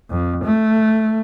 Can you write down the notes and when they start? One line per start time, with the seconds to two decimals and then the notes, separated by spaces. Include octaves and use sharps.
0.11 F2
0.44 A3